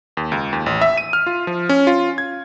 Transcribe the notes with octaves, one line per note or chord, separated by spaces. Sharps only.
D#2
C#2
D#2
A1
E5
D#7
F6
F4
F3
C#4
F4
G#6